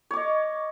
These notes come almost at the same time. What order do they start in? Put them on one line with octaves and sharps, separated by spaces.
C#5 D6 D#5